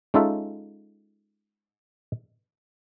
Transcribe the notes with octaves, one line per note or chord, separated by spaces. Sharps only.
G#3 C#4 D#4 F4 A4 E5